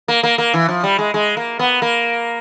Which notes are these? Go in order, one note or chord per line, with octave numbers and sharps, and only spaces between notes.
A#3
A#3
A#3
E3
F3
G3
G#3
G#3
A#3
B3
A#3